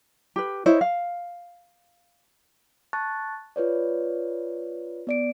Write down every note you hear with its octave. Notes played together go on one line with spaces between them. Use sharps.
G4 B4
E4 C5 C#5 D#5
F5
A5 C#6 F#6 A6
F4 B4 C#5 D5
B3 D5 D7